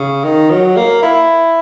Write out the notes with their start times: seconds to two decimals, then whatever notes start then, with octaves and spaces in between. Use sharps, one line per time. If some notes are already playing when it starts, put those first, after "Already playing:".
Already playing: C#3
0.24 D#3
0.50 F#3
0.77 A#3
1.02 E4